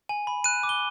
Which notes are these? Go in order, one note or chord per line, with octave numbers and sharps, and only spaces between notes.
G#5
B5
F#6 D#7
D6
G7